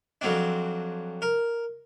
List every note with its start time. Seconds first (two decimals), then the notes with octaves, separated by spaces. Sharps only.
0.21 F2 F#3 C4 D4
1.22 A#4